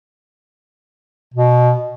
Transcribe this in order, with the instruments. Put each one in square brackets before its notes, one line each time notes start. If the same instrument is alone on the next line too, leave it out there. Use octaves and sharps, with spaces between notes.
[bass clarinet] B2